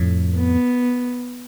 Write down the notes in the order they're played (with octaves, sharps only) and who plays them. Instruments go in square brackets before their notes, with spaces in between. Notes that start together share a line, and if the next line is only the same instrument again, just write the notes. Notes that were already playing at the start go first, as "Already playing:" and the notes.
Already playing: [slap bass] F2 A2
[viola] B3